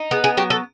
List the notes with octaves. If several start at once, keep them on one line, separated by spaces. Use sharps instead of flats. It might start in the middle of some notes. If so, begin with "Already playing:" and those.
Already playing: D#4
B3 G#4
G#4
F#3 G4
A4